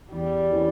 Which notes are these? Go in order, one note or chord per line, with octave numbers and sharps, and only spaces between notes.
E2 G3
E3 A#3 C#4 E4